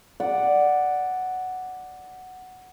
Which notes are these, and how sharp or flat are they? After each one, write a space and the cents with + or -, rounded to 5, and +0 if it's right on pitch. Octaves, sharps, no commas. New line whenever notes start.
D5 +0 F#5 +0